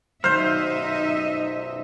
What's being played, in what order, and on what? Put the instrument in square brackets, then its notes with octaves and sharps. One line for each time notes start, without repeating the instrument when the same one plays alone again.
[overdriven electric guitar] B1 F#2 [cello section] D#4 D#5 E5 [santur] C5 [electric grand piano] F6 G6